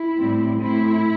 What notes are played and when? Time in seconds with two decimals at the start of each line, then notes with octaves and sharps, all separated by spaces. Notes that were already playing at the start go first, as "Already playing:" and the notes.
Already playing: E4
0.18 A2 G3 C4
0.60 A2 A3 C4 E4